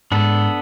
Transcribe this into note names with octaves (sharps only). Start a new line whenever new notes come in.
G#2 B3 D4 A4